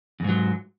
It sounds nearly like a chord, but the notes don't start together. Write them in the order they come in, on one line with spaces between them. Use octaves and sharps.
E2 G#2 F#3